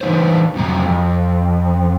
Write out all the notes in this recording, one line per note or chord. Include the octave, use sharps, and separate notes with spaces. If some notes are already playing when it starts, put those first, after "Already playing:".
E3 G3 D4 D#4 B4 C5
F2 C3 F#3 A#5
F2